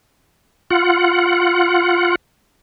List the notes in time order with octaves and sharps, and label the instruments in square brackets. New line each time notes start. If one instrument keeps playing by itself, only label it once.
[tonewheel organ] F4 F#5